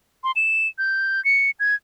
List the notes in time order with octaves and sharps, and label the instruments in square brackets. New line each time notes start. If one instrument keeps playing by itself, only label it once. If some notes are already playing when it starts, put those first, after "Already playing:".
[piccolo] C6
E7
G6
C#7
G#6